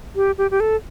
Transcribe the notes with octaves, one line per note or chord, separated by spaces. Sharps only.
G4
G4
G4
A4